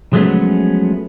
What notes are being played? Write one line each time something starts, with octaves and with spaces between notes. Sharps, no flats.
F3 F#3 G#3 A3 B3 C#4